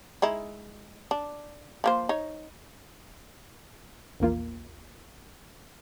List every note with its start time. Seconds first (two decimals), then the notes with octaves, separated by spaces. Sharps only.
0.22 G#3 D#4 E4
1.11 D4
1.84 F3 A#3 C5
2.09 D#4 C#5
4.20 A#1 E2 A#3 F4